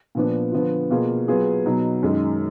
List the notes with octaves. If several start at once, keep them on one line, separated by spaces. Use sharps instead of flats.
A#2 F3 B3 D4
D3 F3 B3 F4
B2 A#3 F4 G#4
F#3 B3 F4 G#4
B2 F#3 B3 D#4
F#2 D#3 G#3